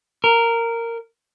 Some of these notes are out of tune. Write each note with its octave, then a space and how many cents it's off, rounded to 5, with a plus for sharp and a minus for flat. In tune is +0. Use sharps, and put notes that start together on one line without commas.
A#4 -10